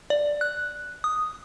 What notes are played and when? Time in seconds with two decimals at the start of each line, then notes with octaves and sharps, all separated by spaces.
0.10 D5
0.41 F#6
1.04 D#6